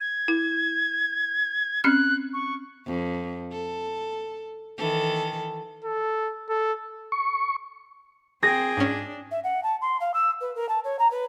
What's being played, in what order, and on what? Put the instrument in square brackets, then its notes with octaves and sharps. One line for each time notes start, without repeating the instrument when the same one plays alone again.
[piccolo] G#6
[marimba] E4
[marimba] C4 C#4 F6 [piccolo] F#6
[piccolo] C#6
[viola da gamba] F2
A4
D#3 E3 A4
[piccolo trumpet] A4
A4
[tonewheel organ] C#6
[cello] C4 G5 [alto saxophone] G#4 [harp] A#6
[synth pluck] G#2 C#4 [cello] D4
[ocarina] E5
F#5
A5
C6
F5
E6
B4
A#4
A5
C#5
A#5
B4